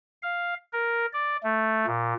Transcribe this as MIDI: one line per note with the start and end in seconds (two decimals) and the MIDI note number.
0.23 0.54 77
0.73 1.06 70
1.13 1.37 74
1.43 1.85 57
1.86 2.14 46